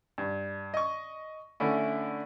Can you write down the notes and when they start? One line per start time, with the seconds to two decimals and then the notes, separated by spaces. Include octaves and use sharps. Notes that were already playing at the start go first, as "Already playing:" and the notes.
0.18 G2
0.74 D#5 C#6
1.60 D3 A3 C#4 E4